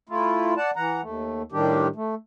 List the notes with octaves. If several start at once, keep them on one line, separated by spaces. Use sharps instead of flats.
A3 E4 F4
D5 F#5 A5
E3 F#5 A#5
D#2 A3
A2 D#3 G3 D4 G4
A3